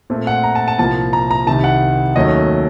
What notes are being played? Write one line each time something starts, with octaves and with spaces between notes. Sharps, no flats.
A#2 A3 C4
F#5
A#5
A5
A5
C2 A#2 F3 A#3 A5
A#5
A#5
C2 C3 D#3 A5
F#5
D#2 D#3 F#3 A3 C#4 D#5